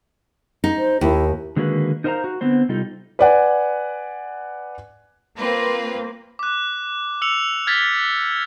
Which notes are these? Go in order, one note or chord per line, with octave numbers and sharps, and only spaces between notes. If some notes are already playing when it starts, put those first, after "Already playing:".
D#4
C5
D#2 E4
D3 D#3 G#3 A#3 F#4 B4
D#4 A#4 C5 D#5 F5 A#5
F#4
D3 B3 C4 C5
C3 G3 D#4 F4 A4
B4 D5 F#5 G#5
A#3 C4 F4 B4
D6 F#6
E6 C#7 F7
F6 G#6 A6 B6